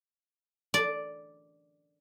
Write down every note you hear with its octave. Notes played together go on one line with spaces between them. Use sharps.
D5